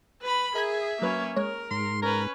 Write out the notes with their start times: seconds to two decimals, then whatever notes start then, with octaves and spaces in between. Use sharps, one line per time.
0.22 B4 B5
0.55 G#4 A#4 E5 G#6
1.02 F#3 A#3 C#4 B4
1.36 G#3 A#4 C#5
1.71 G#2 C6
2.02 C#4 A#4 B4